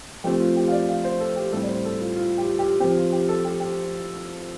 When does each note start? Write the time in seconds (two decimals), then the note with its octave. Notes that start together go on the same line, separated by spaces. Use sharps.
0.24 F3 A3 C4 G4
0.40 F4
0.56 G4
0.68 F5
0.72 D5
0.89 F5
1.04 C5
1.20 A4
1.36 G4
1.52 A2 G3 C4 A4
1.63 D5
1.68 C5
1.85 A4
2.01 F4
2.16 F4
2.38 G4
2.59 G4
2.80 C4 G4
2.84 F3
2.97 F4
3.12 G4
3.29 A4
3.45 G4
3.60 G4